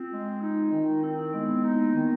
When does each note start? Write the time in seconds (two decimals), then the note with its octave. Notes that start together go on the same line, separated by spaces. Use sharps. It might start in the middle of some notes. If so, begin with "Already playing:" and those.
Already playing: C4 F4
0.12 G#3
0.42 D#4
0.72 D#3
1.03 C4 E4
1.18 D#4
1.33 G#3 B3
1.49 B3
1.64 A#3 D#4
1.84 B3
1.94 D#3 C4